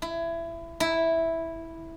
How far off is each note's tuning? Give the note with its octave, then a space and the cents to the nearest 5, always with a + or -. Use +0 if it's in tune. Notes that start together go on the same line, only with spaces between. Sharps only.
E4 +20
E4 -5